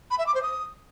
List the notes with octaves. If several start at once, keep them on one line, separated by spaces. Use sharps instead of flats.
B5
E5
D6
C5
D#6